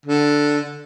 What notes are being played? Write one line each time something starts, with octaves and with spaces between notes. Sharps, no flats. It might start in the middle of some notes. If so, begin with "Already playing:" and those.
D3